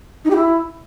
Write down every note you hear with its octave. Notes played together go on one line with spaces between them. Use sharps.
D#4
G4
E4